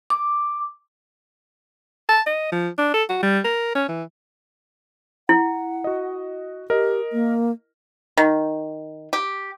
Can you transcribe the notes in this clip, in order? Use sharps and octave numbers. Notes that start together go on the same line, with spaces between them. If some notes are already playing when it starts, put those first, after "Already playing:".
D6
A5
D#5
F3
D4
A4
F#4
G3
A#4
C#4
E3
E4 F#5
F#4 D#5
G4 A#4 D#5
A#3
D#3
G4